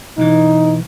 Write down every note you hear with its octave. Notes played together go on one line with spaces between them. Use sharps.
B1 E3 D#4